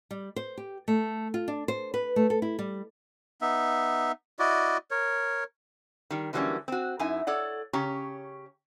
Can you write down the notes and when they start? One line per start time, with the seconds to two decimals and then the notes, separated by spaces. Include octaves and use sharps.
0.11 G3
0.36 C5
0.58 G4
0.88 A3
1.34 F4
1.48 D4
1.68 C5
1.94 B4
2.16 A3
2.30 A4
2.42 E4
2.59 G3
3.41 B3 D#4 E5
4.39 E4 F#4 D5 D#5
4.91 A#4 C#5
6.10 D#3 G3
6.33 D3 E3 F#3 G3 A#3 C#4
6.68 C4 F#4
6.99 F#2 D#4 E4 G#5
7.27 A4 C#5 D5 F#5
7.73 C#3 C#4 G4 C#5 A#5